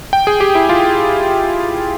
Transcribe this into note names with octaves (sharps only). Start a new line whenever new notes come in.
G5
G#4
G4
E4
F4